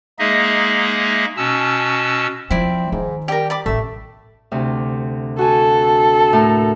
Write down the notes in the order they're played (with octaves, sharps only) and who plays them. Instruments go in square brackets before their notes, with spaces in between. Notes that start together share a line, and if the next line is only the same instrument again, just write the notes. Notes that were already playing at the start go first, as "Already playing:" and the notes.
[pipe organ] G#3 A#3 D#4 G#4 D#5 E5
B2 C#4 A5 E6
[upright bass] F3 [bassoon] C4 [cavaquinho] E4 D5
[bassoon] G#2 [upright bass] D#3
[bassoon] G3 [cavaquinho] G4 A#4
[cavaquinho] D5 B5 D6
[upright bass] A1 [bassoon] A3 [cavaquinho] E5
[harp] D2 C3
[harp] F#4 G#5 [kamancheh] A4
[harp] A2 A#4